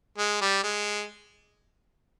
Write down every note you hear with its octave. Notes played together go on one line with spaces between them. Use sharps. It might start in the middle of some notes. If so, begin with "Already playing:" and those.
G#3
G3
G#3